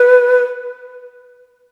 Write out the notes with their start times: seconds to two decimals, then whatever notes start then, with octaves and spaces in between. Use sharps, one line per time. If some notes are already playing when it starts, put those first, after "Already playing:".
Already playing: B4